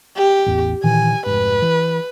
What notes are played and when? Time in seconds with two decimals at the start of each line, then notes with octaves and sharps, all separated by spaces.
0.17 G4
0.46 A1 E2
0.84 A#2 D#3 E3 G#5
1.26 F1 G#2 B4
1.62 E3